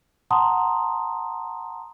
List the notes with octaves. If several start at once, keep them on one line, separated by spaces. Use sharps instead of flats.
F#5 A5 A#5 C6 D#6